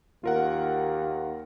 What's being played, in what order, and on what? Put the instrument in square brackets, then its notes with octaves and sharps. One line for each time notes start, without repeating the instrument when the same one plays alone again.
[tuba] D#2 [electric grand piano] F4 A#4 F#5